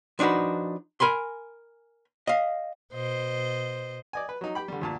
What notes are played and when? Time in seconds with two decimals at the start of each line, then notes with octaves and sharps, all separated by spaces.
0.19 F3 D4 D#4 F#4 B4
1.00 A#4 G#5 B5 C6
2.27 D#5 F5
2.93 B2 C5 D#5
4.13 D5 D#5 G#5
4.29 B4
4.41 F#3 D#4
4.55 G4 G5 B5
4.68 D3 G3
4.81 D2 A#2 A5